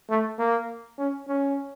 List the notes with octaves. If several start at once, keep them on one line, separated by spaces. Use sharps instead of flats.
A3
A#3
C#4
C#4